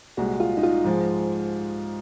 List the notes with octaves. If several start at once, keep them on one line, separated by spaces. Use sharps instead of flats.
C2 A#2 G#3 F#4
F4
D#4
F4
G#2 F3 G#3